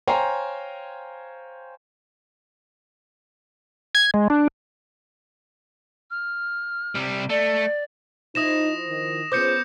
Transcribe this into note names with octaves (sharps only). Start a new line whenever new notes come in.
C5 C#5 F5 G5 G#5 A#5
G#6
G#3
D4
F6
C3 G3
A3 D5
F3 D#4 E4 D#6 A#6 E7
D#3
B3 C#4 F4 G#4 C5 D6 G6 C#7